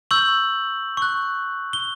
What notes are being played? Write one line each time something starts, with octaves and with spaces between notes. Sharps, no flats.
C#6 E6 G6 F#7
C#6 F#6
G7